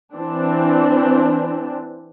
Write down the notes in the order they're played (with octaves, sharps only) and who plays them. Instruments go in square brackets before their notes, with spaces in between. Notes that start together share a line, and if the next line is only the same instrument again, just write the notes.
[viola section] E3 C4 D4